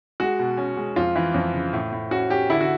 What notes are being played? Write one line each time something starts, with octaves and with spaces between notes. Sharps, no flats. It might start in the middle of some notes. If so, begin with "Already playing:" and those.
G#3 F#4
B2
C#4
G#3
F2 F4
E3
F2
C#3
A2
A2
C#4 F#4
C#4 G4
D3 E4
F#4